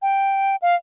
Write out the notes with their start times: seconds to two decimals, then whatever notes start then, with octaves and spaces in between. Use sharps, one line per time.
0.02 G5
0.62 F5